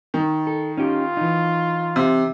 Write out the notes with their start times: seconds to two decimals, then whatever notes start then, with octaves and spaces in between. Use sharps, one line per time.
0.14 D#3
0.47 A4
0.77 C#4 D#4 F4 G4
1.17 E3 D#4
1.96 C3